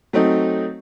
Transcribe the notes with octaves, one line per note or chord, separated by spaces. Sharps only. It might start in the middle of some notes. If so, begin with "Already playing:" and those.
F#3 A3 C4 D#4